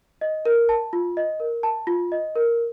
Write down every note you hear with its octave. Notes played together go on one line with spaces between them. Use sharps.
D#5
A#4
A5
F4
D#5
A#4
A5
F4
D#5
A#4